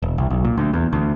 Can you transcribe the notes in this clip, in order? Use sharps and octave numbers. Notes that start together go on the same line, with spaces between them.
E1
C2
B1
A#2
D2
E2
D2